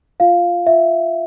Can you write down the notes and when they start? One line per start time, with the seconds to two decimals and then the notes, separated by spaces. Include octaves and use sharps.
0.20 F4 F5
0.67 F4 E5